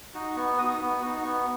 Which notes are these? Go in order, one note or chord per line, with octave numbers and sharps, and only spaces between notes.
D#4 F#4
B3 C#6
D#4 F#4 D#6
B3
D#4 F#4
B3 C#6